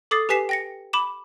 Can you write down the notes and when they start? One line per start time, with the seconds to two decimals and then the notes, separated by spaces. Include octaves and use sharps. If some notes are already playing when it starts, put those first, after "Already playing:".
0.11 A4 D6 D#6 A6 C7
0.29 G4 B4 G#5 B6 C7 E7
0.49 G5 A#6 C#7
0.93 B5 D6 E7